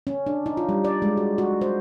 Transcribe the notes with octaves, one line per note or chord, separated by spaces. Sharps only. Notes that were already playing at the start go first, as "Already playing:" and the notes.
C#4
D4
D#4
F4
G3
D5
G#3
F#4
F#4
C5